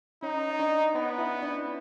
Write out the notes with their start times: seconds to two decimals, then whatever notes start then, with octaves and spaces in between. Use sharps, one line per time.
0.23 C#4 D#4 C#5
0.50 D#5
0.59 D4 D5
0.95 B3 D#4 D#5
1.18 E4 E5
1.42 D4 D5